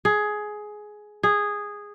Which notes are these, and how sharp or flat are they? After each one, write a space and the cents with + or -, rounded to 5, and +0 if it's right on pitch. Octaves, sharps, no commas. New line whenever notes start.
G#4 +15
G#4 -10